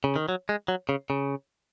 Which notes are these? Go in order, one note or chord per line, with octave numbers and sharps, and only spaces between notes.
C#3
D#3
F#3
G#3
F#3
C#3
C#3